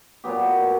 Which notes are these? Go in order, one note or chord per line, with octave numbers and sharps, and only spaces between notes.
A#2 F#3 B3 G4